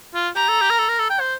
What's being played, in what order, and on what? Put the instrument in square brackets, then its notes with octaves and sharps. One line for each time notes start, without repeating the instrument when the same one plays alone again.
[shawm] F4
[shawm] G4 [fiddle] A#5
[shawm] A4
G4
A#4
A4
A#4
A4
G5
C5